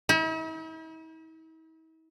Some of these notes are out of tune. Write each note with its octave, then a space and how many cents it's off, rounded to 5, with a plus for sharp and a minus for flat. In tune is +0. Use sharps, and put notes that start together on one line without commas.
E4 -45